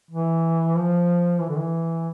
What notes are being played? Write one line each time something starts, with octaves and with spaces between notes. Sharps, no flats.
E3
F3
E3
D3
E3